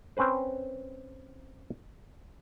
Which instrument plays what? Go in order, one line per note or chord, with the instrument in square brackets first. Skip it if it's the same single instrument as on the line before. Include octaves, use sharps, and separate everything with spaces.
[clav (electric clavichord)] C4 C#4 B4 C5